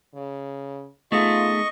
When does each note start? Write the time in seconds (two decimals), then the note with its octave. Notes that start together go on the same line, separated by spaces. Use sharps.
0.15 C#3
1.12 A3 B3 D#4 F4 G#4 D#5 C#6